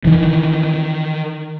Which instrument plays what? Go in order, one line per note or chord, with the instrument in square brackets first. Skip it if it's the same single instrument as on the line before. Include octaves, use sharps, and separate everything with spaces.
[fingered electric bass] D#3 E3